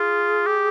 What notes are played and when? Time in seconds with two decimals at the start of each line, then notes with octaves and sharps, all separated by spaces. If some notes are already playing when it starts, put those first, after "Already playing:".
Already playing: F4 G#4
0.46 G4